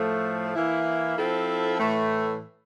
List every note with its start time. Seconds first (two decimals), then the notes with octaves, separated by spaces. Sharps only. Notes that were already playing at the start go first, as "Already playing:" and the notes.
Already playing: A2 F3 A3
0.54 E3 A#3 E4
1.17 F3 C4 E4 A4
1.79 A2 E3 A3